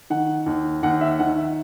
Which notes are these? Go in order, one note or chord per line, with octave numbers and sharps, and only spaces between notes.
D#3 F#5
D#2
D#2 F#5
E5
D#3 F#5
E5